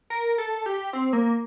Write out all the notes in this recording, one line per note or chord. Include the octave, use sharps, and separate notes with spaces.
A#4
A4
G4
C4
A#3